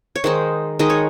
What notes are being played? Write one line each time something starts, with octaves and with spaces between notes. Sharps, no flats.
C#5
D#3 G#3 D#4 C5
D#3 G#3 D#4 D#5
C#5